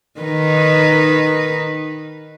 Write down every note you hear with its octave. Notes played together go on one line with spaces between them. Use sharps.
D#3 D#4 B4